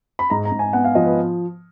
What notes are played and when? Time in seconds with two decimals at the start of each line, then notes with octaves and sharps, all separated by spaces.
0.19 B5
0.30 G#2 A#5
0.45 A#5
0.52 G#2
0.59 G#5
0.73 B3 F#5
0.85 F5
0.95 F3 D#5
1.06 B4